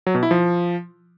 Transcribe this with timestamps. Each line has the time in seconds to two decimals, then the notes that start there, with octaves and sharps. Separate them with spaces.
0.07 F#3
0.15 B2
0.23 E4
0.31 F3